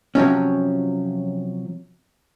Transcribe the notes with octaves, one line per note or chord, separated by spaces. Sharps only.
C3 F3 F#3 C#4